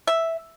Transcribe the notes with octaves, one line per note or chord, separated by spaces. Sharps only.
E5